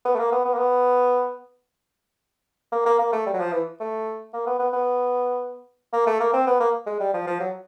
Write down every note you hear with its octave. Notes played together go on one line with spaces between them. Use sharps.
B3
A3
A#3
B3
B3
A#3
B3
A#3
A#3
A#3
A3
G3
F#3
F3
E3
A3
A#3
B3
B3
B3
A#3
A3
A#3
C4
B3
A#3
G#3
G3
F3
F3
F#3